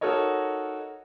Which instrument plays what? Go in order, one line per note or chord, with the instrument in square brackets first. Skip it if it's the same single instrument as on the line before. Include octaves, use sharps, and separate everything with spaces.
[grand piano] D#4 F#4 A4 A#4 C#5 D#5